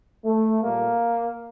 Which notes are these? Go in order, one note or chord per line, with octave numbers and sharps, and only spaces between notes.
A3
A#2 G3 A#3